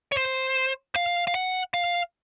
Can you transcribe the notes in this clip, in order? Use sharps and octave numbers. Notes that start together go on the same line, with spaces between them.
C#5
C5
F5
F5
F#5
F5